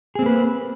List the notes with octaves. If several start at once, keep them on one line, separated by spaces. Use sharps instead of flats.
A#3 C4 G#4 B4